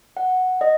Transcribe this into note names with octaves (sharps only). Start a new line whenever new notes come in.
F#5
D#5